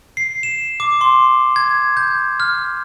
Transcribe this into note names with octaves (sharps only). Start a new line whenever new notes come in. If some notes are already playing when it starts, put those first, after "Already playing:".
C7
E7
D6
C6
G#6
G6
F6